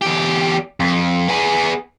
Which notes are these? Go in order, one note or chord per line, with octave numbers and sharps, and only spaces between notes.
E2 G4
F2
B3 G#4